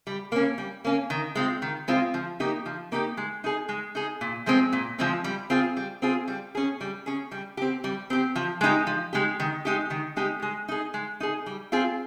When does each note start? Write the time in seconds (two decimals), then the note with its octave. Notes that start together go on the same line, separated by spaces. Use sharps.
0.07 G3
0.32 A#3 C#4
0.58 G3
0.85 A#3 C#4
1.10 D#3
1.35 G#3 C4 F4
1.62 D#3
1.88 G#3 C4 F4
2.14 F3
2.40 A#3 D#4 G4
2.66 F3
2.92 A#3 D#4 G4
3.17 G#3
3.44 D#4 G#4
3.69 G#3
3.95 D#4 G#4
4.21 A#2
4.46 F3 G#3 C4
4.73 A#2
4.99 F3 G#3 C4
5.24 G3
5.50 C4 F4 G#4
5.77 G3
6.02 C4 F4 G#4
6.28 G3
6.55 C#4 G#4
6.81 G3
7.06 C#4 G#4
7.32 G3
7.57 C4 G4
7.84 G3
8.10 C4 G4
8.36 F3
8.61 G#3 D#4 G4
8.87 F3
9.13 G#3 D#4 G4
9.40 D#3
9.65 G#3 D#4 G4
9.90 D#3
10.17 G#3 D#4 G4
10.42 G#3
10.68 D#4 G#4
10.94 G#3
11.20 D#4 G#4
11.46 G3
11.72 C4 F4 G#4